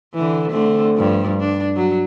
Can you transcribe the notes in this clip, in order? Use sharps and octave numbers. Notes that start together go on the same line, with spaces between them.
D3 E3
D3 A3 C4
G2 F3
D4
F#3